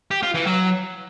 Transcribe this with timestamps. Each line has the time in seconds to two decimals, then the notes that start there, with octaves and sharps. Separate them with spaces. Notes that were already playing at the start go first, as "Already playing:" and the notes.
0.11 G4
0.23 F4
0.35 E3
0.46 F#3